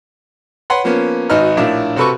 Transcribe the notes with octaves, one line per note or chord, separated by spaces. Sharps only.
B4 C#5 F#5 B5 C6
F3 A#3 B3 C#4
G#1 D#4 F#4 B4 D#5 F6
A#1 A2 D4 E4 A#4 E5
C3 F#4 A4 B4 B5 C#6